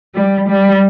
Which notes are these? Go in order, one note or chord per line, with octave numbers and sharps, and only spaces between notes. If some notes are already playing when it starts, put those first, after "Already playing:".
G3
G3